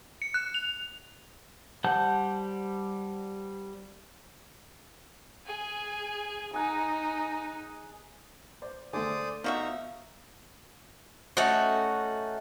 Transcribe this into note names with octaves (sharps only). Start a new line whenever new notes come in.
C#7
F#6
F7
G3 C5 F#5 A5 G6
G#4 G#5
D#4 G#4 F#5 A#5
C5 D5
D3 A3 C5 D5 G#5 D#6
F3 B3 D#4 F#4 E5 F5 A#5
A3 C#4 D#4 F#4